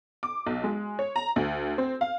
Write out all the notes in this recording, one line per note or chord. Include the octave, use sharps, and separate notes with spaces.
D6
B1
G#3
C#5
A#5
D2
C4
F5